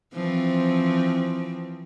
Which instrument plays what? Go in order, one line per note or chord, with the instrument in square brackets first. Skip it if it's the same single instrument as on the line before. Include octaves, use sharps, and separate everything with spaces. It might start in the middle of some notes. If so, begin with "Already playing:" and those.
[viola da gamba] E3 F3 C4